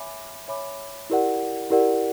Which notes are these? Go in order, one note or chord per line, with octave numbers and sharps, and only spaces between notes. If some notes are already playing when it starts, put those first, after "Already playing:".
Already playing: C#5 E5 G#5 B5 D6
C#5 E5 G#5 B5 D6
E4 G4 A#4 D5 F#5
E4 G4 A#4 D5 F#5